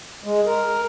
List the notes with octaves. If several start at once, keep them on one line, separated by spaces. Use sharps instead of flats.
G#3
A#4